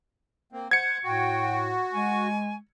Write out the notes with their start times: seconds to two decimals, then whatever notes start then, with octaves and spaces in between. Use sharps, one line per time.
0.52 A#3 C4
0.71 C5 F#5 G#6 C#7
1.03 A2 F#4 G5
1.92 G#3 G#5 C#6